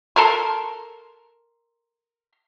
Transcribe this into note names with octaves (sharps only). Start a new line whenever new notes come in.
A4 A#4 C6